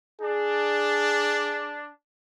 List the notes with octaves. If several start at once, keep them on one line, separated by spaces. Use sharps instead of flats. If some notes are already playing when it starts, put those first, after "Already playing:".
D4 G#4